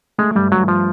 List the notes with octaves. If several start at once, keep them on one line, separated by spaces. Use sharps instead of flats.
G#3 A3
G2 G3
G2 F#3
F3